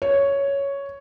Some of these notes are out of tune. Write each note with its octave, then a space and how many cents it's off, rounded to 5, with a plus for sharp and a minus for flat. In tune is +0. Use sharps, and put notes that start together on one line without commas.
C#5 +5